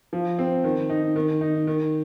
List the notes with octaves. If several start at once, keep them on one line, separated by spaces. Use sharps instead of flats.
F3
C4
D#3
D#4
D#3
D#4
D#3